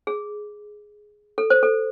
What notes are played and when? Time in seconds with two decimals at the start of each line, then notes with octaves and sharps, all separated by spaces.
0.07 G#4
1.38 A4
1.50 C5
1.63 A4